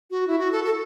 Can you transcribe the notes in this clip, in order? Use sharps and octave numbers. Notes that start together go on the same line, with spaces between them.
F#4
E4
F#4
A4
A4